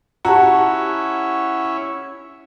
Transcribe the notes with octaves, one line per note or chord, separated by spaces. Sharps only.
C#4 E4 F#4 G4 A5 A#5